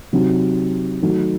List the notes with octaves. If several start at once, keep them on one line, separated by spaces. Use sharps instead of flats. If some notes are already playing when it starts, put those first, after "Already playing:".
C3 F#3 C4 D#4 F#4
D#3 F#3 A3 D#4 F#4